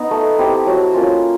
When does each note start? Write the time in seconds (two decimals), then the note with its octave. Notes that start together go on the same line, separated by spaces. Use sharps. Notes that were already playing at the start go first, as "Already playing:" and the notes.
Already playing: B3 D#4
0.11 A3
0.38 C4 E4 G4
0.66 F#3
0.94 A#3 C#4 F4